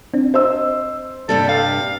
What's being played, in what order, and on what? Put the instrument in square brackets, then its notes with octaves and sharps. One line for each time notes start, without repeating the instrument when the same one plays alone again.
[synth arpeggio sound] C4 D4
[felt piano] C5 D#5 E6
[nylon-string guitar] G2 C3 G3 [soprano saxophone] A4
[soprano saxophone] F5